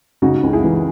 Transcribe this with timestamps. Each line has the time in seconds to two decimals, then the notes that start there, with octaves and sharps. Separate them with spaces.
0.22 C#3 D#4 F#4
0.43 C#2
0.53 E4 G#4
0.64 E3